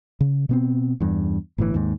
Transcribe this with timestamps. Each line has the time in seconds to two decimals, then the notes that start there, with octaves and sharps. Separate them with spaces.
0.21 C#3
0.49 B2 B3 C4
1.00 E2 G2
1.58 G1 A2 C#3 E3
1.74 D#2 G#2